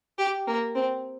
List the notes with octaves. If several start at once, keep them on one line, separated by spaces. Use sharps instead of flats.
G4
A#3
C4